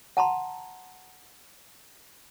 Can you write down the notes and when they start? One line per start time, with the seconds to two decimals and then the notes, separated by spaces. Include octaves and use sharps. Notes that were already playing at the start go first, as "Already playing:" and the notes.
0.17 F#5 A5 A#5 C6